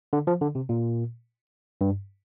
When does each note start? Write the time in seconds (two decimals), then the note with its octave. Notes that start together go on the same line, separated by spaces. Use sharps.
0.13 D3
0.27 F3
0.42 D3
0.55 C3
0.69 A#2
1.81 G2